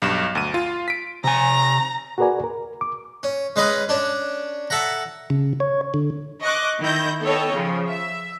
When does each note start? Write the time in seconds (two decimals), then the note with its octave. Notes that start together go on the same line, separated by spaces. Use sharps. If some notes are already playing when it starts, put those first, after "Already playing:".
0.02 B1 G2 E7
0.35 D2 D#7
0.54 F4
0.88 B6 D7
1.24 C3 G#5 A#5
2.18 F#4 G#4 A#4 B4 D5 G#5
2.44 A#4
2.81 D6
3.23 C#4
3.56 G#3 C#4 B4 D#5 F5
3.89 C#4 D4
4.70 A4 E5 F#5 A#5
5.30 C#3
5.60 C#5
5.94 D3
6.42 D#5 C#6 D6 F#6
6.82 D#3 E4 G6 A#6
7.23 B3 A4 C#5 D#5 G5
7.53 C#3 F3
7.89 E5